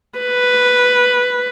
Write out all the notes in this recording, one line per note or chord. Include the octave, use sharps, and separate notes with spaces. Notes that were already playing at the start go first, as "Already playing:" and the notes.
B4